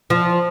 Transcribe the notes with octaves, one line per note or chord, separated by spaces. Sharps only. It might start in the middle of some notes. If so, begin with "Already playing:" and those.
F3